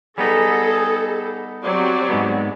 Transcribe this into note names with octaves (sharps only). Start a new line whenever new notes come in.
G3 B3 D#4 G#4 A4
F#3 C4 G4 D5
G#2 G#3 B3